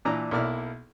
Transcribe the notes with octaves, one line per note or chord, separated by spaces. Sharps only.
A#2 E3 D4 A#5
B1 A#3 E4 D5 F6